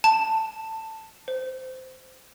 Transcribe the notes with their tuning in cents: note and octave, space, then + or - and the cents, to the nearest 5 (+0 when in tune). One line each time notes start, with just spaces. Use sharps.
A5 +15
C5 -15